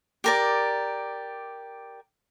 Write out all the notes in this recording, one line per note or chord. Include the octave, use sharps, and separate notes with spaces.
G4 A#4 D5